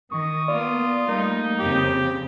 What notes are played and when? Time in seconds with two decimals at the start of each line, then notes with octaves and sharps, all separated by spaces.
0.11 D#3 C#6 D#6
0.48 A#3 B3 F4 D5
1.09 G3 A3 A#3 D#4
1.59 F2 C#3 C4 G4